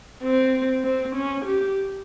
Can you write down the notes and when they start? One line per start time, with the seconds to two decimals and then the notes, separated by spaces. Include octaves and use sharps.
0.23 C4
0.84 C4
1.16 C#4
1.45 G4